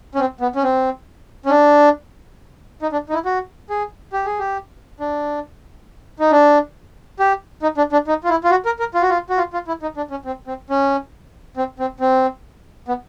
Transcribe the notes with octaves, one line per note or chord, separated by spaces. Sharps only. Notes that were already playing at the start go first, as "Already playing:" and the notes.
C#4
C4
B3
C#4
C4
C#4
D4
D#4
D4
D#4
E4
F#4
G#4
G4
G#4
G4
D4
D#4
D4
G4
D#4
D4
D4
D#4
F4
E4
F4
F#4
A#4
A#4
F4
F#4
F4
F#4
F4
F4
E4
D#4
D4
C#4
C4
C4
C#4
C4
C4
C4
B3